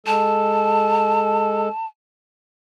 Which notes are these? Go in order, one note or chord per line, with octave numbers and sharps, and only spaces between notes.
G#3 A4 A5